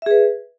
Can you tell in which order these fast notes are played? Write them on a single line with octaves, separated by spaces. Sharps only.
E5 G#4 B4